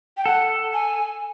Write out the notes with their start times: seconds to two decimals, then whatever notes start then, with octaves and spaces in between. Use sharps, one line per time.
0.17 G5
0.25 A4 F#5
0.73 G#5